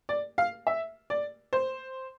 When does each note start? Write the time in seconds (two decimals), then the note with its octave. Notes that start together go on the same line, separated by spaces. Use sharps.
0.09 D5
0.38 F5
0.67 E5
1.10 D5
1.53 C5